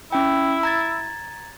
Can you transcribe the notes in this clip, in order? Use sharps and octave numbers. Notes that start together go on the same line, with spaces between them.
C#4 E4 G5
A#5 G#6 A6